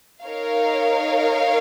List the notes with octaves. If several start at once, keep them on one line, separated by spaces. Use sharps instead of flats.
D#4 A#4 C#5 F5